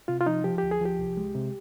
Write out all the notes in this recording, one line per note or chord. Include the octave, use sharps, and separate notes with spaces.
C3 F4
F4
F3 D#4
F3 G4
D2 G4
G#4
F3 G4
C2
G#3
C3